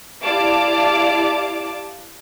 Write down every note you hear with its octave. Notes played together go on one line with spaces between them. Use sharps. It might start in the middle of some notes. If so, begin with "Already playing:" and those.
E4 G4 D5 F5 A5 D6